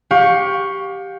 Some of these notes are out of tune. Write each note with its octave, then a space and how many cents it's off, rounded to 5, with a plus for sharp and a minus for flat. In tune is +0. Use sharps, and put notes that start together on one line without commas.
G4 +0 F5 +35 C#6 +0